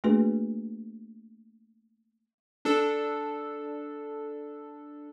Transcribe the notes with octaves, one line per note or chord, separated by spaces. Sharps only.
A3 A#3 D4 F#4 G#4 B4
D4 A4